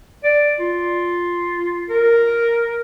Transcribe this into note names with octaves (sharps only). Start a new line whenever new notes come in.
D5
F4
A#4